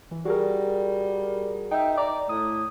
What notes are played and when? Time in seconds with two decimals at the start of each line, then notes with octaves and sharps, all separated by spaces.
0.11 E3
0.25 G3 F#4 G#4 A#4
1.71 D#4 E5 G5
1.97 D5 A#5 D6
2.29 A2 D#6